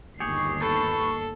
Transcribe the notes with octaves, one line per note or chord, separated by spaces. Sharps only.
G1 D#2 G4 G#4 C#6 C7
A4 B4 G5 A5